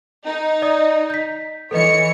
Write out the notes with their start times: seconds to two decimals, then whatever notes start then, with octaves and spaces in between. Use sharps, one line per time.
0.25 D#4
0.62 D5 D#5 D#6
1.10 G6 B6
1.71 E3 A4 B4 C#5 D#5 C#7